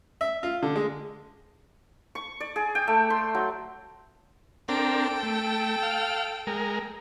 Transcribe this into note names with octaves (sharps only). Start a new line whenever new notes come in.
E5
F4
D3
G#3
C#6
D5
G#4
G5
A3
C6
F#3
C4 D4 A4 A#4 G5
A3
F5
G#3 A#4